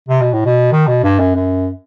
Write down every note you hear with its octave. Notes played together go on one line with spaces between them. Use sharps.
C3
B2
A2
B2
D#3
B2
G2
F#2
F#2